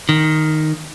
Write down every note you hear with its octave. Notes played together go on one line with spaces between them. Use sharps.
D#3